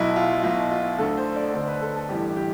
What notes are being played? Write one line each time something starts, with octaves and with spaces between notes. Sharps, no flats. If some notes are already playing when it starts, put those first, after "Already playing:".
Already playing: B1 B2 E4
F4
B1 B2 F4
F4
D2 D3 A4
C5
D5
D2 D3 C5
B4
A4
A4
A1 G2 E3 G4
G4